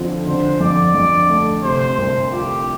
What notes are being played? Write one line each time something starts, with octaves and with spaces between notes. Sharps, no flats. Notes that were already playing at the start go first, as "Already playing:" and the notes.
Already playing: F2 D3 F3 C4
D3 C5
F2 D5
F2
A3
C3 C5
C2
F4 G4